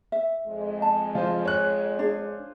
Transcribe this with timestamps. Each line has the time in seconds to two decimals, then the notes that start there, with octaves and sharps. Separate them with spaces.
0.12 E5
0.47 F2 G#3
0.82 A5
1.15 F3 F4 C5
1.45 C#5 F#6
1.99 D4 G#4